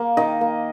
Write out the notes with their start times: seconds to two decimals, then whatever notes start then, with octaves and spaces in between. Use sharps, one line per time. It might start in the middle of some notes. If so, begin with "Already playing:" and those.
Already playing: A#3 F5
0.17 D#3 D#5
0.41 A#3